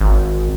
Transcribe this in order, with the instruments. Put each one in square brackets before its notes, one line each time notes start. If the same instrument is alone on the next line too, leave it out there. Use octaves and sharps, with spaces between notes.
[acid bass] G#1